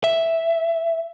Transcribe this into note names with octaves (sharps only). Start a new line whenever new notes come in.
E5